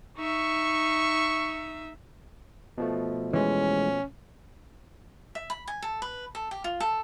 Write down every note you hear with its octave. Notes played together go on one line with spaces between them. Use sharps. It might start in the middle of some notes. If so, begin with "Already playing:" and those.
D#4 E5 C#6
B2 F3 A3
E3 G#3 C#4
E5
B5
G#5
A4
B4
A4
G4
F4
A4